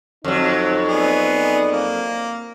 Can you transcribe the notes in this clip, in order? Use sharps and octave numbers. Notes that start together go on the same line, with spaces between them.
F2 F#3 D#4
B3 G#4 D5
A#3